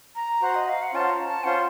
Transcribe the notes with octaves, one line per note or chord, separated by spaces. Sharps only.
A#5
F#4 C5 F#5
D#5
F5
F#5
C#4 F4 C5 A5
A#5
A5
C#4 F4 C5 F#5